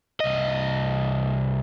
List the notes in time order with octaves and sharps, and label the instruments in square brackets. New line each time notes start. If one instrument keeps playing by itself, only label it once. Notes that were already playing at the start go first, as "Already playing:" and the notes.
[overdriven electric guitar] C2 D#5